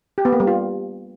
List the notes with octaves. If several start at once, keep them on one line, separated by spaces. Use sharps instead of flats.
G4
B3
A#3
G3
F4